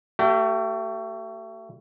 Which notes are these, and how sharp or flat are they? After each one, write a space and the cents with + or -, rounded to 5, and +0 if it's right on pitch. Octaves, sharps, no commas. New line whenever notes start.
A3 +30 G4 -35